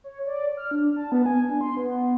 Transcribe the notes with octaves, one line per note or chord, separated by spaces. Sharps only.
C#5
D5
F6
D4
A5
B3
G#5
D4
C6
B3